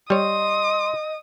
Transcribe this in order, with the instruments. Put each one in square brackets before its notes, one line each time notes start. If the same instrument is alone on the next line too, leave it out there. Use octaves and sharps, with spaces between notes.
[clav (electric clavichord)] G3 C#5 [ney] D#5 [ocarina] C6 [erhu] D#6